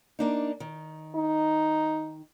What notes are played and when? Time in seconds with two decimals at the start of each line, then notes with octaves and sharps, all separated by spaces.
0.19 A#3 D4 D#4
0.60 D#3
1.16 D#4